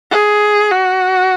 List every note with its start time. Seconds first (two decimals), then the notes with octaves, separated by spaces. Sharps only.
0.11 G#4
0.71 F#4